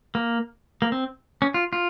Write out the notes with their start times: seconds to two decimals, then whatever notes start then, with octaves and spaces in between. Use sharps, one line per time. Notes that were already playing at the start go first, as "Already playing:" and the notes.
0.15 A#3
0.82 A#3
0.92 C4
1.42 C#4
1.54 F4
1.73 F4